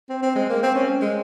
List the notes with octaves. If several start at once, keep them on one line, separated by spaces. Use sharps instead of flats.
C4
C4
G#3
A#3
C4
C#4
G#3